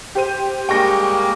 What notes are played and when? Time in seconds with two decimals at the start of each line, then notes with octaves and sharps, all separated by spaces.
0.15 G4 C5 D#7
0.69 G3 G#3 A#3 G5 C#6 A#6